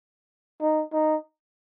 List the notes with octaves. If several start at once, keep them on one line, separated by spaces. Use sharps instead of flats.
D#4
D#4